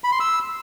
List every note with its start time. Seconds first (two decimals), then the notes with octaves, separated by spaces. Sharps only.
0.04 B5
0.12 C6
0.20 E6